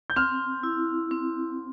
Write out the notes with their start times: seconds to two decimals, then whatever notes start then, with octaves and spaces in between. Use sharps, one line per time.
0.10 G6
0.16 C4 F6
0.63 E4
1.11 C4